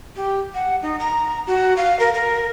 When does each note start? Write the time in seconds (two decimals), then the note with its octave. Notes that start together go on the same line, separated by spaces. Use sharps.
0.16 G4
0.54 F#5
0.82 D#4
0.99 A#5
1.47 F#4
1.77 F5
1.99 A#4
2.14 A#4